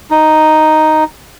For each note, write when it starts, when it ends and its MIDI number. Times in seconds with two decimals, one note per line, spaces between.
0.11 1.04 63